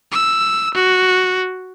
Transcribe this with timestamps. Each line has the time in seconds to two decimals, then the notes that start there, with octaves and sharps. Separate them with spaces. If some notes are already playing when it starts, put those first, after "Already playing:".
0.12 E6
0.75 F#4